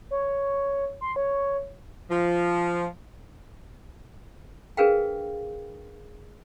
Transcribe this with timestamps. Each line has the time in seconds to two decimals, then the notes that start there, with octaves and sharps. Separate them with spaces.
0.11 C#5
1.01 C6
1.16 C#5
2.10 F3
4.77 D4 G#4 A#4 B4 F5 G5